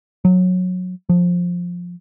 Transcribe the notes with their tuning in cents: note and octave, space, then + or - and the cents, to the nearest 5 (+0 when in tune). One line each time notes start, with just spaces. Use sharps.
F#3 -20
F3 +15